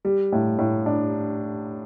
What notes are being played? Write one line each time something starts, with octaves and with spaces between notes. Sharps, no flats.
G3
A2
A2
D4